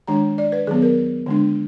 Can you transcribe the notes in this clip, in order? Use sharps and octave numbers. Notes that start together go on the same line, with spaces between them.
D#3 G#3 D4 A#5
D5
B4
D#3 F#3 B3 G#4
A#4
D3 G#3 D4